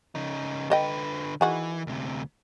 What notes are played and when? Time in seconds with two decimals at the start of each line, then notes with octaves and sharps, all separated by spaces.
0.15 C#3 D#4
0.70 D3 A4 B4 D#5 G5
1.41 D#3 E3 F#4 G#4
1.87 D2 C3